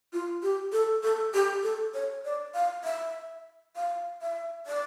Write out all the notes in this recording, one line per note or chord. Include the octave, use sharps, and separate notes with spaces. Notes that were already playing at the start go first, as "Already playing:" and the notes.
F4
G4
A4
A4
G4
A4
C#5
D5
F5
E5
F5
E5
D5